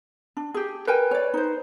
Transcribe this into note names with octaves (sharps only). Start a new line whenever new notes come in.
D4
G4 G#4
A#4 B4 G5 G#5
C#5 D5
D#4 C5